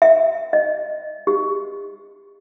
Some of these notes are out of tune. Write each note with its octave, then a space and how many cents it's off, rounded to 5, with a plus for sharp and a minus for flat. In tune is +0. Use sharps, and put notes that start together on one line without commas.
E5 -20
D#5 -25
G4 +45